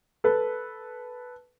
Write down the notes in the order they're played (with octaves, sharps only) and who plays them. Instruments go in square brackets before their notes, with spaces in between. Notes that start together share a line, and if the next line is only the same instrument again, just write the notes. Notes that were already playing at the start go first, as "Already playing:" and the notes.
[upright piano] A4 B4